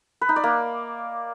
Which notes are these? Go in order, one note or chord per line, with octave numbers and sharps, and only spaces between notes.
B4
D#4
D5
A#3